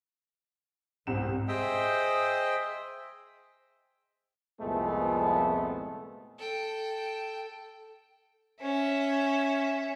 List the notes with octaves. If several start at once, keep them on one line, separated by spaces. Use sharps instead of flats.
C2 G#2 C4 E7
G#4 C5 D#5 E5 G5
C2 F2 A#2 G#3 A3 B3
A4 G5
C#4 E5